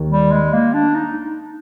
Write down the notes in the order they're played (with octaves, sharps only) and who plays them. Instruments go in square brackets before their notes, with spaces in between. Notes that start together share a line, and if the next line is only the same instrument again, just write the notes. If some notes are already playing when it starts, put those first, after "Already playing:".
Already playing: [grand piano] D#2 D#3 A#3
[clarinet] G3
G#3
A#3
D4
D#4